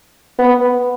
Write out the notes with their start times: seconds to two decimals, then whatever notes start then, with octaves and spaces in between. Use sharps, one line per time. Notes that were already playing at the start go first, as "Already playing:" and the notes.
0.39 B3